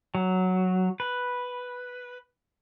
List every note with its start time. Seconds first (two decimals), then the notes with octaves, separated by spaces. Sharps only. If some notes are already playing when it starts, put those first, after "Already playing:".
0.15 F#3
1.00 B4